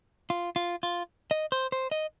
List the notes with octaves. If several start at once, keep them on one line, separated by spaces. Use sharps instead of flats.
F4
F4
F4
D#5
C5
C5
D#5